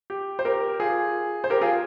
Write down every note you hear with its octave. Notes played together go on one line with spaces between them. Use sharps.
G4
C5
G4 A#4
F4 G#4
C5
G4 A#4
F4 G#4